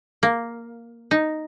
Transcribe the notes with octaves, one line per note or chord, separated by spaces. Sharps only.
A#3
D#4